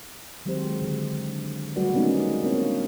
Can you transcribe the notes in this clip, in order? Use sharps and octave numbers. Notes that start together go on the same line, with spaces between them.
D#3 F#3 G#3 C4 G4 C5
D3
F#3 G3 A3 F#4 B4 D5
G#3 A#3 B3 C#4 D#4 F#4
A#3 C4 D4 F4 C#5